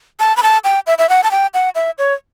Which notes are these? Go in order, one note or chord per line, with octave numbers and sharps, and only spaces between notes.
A5
B5
A5
G5
E5
E5
F#5
A5
G5
F#5
E5
C#5